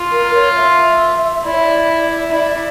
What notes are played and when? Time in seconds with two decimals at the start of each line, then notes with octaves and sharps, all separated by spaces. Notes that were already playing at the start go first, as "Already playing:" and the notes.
Already playing: F4
0.12 A#4
0.34 C#5
0.55 E5
1.44 E4 D5
1.51 C#5
1.60 D5
2.31 E4 D5